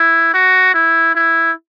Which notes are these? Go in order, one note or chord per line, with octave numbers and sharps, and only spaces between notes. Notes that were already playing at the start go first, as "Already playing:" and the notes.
Already playing: E4
F#4
E4
E4